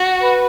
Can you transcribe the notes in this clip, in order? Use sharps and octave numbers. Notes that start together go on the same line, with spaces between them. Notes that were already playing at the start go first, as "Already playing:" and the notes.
Already playing: F#4
B4